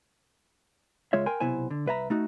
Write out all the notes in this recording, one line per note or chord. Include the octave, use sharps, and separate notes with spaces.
C#2 G#3 F4 C#5 E5
A#4 G5 G#5 C6
B1 C3 B3 E4 C5 G#5
D3
C2 B4 E5 A#5
A3 D#4 F#4